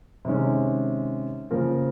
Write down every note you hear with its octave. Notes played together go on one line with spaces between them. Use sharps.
C3 D#3 G#3 C#4
C#3 F3 A#3 F4 A#4